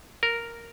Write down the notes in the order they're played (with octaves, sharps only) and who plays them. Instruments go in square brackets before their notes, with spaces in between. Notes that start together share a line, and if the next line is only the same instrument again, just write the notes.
[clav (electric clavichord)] A#4